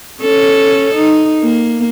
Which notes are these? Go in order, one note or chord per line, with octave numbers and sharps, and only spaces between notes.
C#4 A4
D#4
A#3